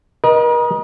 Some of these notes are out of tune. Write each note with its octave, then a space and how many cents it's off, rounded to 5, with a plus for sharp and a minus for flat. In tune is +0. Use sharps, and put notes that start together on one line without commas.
A#4 +45 D#5 -5